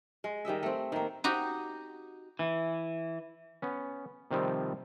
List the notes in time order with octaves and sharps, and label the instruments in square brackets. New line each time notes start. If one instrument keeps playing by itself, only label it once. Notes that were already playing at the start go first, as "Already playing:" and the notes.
[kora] G#3
D#3 G3 D#5 E5
A3 C4
D#3 A#3
[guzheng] D#4 F#4 G4
[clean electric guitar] E3
[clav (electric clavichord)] B3 C#4
C3 D#3 F3 G3 C4